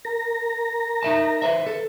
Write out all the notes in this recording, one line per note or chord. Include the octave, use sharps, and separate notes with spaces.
A#4 A#5
D#4 E5 A5
B4 C5 E5
A4